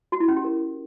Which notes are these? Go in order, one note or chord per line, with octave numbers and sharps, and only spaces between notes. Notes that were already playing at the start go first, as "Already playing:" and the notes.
F#4
E4
C#4
G4
A#4